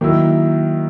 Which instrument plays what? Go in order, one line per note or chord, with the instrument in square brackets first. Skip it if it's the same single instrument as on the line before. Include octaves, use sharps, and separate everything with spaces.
[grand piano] D#3 F#3 A#3 E4